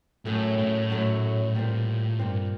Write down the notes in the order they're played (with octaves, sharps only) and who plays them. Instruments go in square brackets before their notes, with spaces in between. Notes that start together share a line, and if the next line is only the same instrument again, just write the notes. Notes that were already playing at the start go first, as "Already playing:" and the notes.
[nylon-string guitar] F#2 F#3 A3 [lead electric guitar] A2
[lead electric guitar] A2
[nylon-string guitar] F#2 F#3 A3
A#2 G3 C4
[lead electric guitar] G2 [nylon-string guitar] A#2 G3 C4